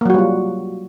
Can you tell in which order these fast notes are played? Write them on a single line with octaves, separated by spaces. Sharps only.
A#3 F#3 F#4 G3 F4